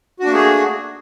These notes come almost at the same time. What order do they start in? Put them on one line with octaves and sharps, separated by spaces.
F#4 D4 A#3 A3 G#4